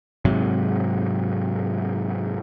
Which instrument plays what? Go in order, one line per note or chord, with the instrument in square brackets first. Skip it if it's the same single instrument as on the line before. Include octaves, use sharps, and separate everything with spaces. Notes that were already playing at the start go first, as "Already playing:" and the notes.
[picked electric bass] G#2 C3 F#3